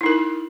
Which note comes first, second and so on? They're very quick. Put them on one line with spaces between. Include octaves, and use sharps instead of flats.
E4 D#4 A#4